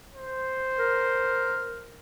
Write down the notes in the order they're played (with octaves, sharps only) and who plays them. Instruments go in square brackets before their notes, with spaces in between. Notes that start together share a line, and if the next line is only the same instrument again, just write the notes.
[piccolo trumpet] C5
[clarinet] A#4